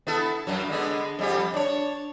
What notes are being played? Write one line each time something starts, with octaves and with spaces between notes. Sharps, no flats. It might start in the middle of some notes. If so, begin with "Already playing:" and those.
B3 E4 A4
F#2 F#3
D3 G#3 B3
F2 G3 G4
D4 C#5